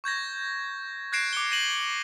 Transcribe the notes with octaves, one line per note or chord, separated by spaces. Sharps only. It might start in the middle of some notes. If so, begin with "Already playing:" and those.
C#6 G6 G#6 A#6
F#6 G#6 A#6 C7 D7 E7
D6 C#7 G7
A#6 D#7 E7 F#7